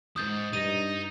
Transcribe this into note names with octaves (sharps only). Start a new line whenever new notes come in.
C#2 G#2 D#6 G6 A6
G2 D#4 A#6 D#7